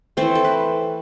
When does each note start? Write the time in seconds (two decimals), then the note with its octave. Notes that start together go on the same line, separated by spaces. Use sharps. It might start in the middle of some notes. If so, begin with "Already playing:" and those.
0.17 E3 A3 C4 C5
0.35 A4
0.44 B4